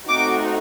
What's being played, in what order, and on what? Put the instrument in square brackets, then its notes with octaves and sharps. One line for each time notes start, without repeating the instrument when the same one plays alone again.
[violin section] A3 C4 D#4 F#4 D6